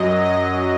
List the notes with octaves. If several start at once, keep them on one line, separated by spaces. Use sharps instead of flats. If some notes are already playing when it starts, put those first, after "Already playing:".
Already playing: F#2 F#3 D#5
D#5